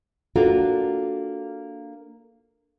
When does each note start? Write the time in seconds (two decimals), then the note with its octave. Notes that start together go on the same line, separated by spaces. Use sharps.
0.36 A#3 D4 F4 F#4 A4 A#4